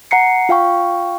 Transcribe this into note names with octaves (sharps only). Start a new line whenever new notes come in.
F#5 A#5 C7 C#7
F4 F5 G5 C#6